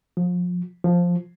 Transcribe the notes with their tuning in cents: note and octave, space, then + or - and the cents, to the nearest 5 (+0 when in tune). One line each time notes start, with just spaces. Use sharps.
F3 +30
F3 +5